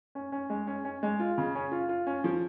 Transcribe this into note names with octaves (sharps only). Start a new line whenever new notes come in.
C#4
C#4
G#3
C#4
C#4
G#3
F4
C#3
C#4
F4
F4
C#4
F3